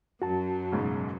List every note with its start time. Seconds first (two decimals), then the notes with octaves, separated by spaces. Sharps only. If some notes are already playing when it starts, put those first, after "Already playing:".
0.22 F#2 F#3 F#4 A5
0.72 B1 G#2 C#3